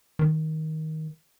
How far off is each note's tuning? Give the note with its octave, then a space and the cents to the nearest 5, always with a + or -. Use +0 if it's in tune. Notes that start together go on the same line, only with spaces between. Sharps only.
D#3 +15